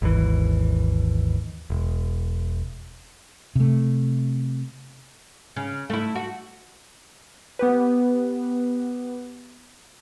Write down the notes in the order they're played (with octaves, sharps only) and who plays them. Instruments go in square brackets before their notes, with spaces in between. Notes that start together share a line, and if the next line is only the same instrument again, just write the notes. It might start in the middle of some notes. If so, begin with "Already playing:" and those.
[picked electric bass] G#1 D#2 E3
E1
[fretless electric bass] C3 A3
[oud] C#3
A3 E4
F#4
[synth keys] B3 G4 B4